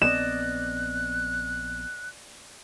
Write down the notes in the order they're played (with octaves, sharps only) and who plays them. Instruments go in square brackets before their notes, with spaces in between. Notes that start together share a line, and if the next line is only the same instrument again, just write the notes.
[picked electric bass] A#1 B3 C4 [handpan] D5 D#5 [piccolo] F#6 [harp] E7